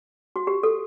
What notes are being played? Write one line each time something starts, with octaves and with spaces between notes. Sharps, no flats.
F#4
G4
A4